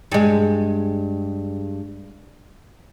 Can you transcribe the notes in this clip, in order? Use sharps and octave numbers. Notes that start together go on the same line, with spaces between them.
G2 G#3